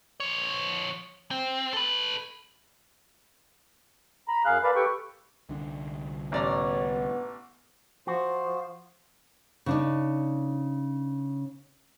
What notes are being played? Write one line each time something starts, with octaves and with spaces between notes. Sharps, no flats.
F3 C#5
C4
A4 B4
A#5 B5
F#2 G#4 F5 F#6
A#4 B4 D5 F5 A5 B5
G4 A4 B4 G5 C#6
C2 D3 D4
A1 B3 C#5 D5 A#5
F3 F#4 C5
C#3 D4 D#4